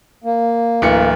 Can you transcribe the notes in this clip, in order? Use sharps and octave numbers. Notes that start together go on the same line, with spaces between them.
A#3
D1 E3 C#7